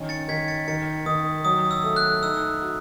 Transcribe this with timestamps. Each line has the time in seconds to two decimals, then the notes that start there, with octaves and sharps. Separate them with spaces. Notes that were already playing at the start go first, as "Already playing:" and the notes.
Already playing: D#3 C#4
0.09 A6 C#7
0.28 D#3 G#6 B6
0.48 A6 C#7
0.68 D#3 A6 C#7
1.06 D#3 D#6
1.45 F#3 D#6
1.71 E6
1.84 A3
1.96 F#6
2.22 D#4 E6
2.61 F#4